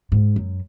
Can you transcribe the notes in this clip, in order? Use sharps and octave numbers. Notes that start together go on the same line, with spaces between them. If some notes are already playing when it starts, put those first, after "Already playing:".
G#2
F#2